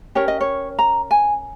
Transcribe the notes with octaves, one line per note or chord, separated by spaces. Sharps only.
C#4 G4 A#4 C#5
D#5
C#5
A#5
G#5